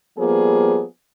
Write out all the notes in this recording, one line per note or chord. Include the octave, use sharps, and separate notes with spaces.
F3 G3 A#3 B3 G#4